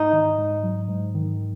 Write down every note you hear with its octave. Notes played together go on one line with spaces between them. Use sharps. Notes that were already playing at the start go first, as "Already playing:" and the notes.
Already playing: G#2 D#4
D#3
G#2
F#3
G#2
D#3